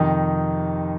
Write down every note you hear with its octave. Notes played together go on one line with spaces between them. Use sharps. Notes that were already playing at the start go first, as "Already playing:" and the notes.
Already playing: F2 C3 D#3 D#4